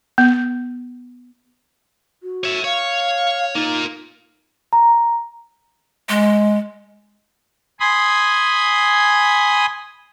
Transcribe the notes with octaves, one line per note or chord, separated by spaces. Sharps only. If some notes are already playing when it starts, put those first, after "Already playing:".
B3
F#4
C#5 E5
C#5 F5
A#3 D#4 F4
A#5
G#3
G#5 B5 C6 D#6